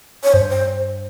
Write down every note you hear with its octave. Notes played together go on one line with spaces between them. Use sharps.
C#5
G2 C5
C5